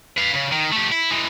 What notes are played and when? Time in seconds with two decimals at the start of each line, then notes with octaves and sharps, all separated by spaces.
0.17 B4 F5
0.34 C#3
0.52 D#3
0.72 A3 G4
0.92 E4
1.11 E3 G#3